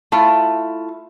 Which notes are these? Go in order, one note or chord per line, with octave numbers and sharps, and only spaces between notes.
A3 E4 F4